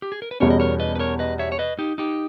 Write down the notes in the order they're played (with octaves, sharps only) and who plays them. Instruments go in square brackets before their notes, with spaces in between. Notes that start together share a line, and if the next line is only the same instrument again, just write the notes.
[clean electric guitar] G4
G#4
A#4
B4
[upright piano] E2 B2 G3 C#4 [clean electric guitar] A#4 C#5
[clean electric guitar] D#5
A#4 C#5
B4 D#5
B4
A#4 C#5
B4 D#5
C#5 E5
C#5
B4 D#5
D#4 G4
D#4 G4